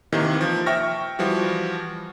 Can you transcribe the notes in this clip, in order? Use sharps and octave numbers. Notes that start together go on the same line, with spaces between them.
C3 D#3 E3 A#3
F3
E5 G5 C#6 F6 A#6
E3 F3 G3 F#4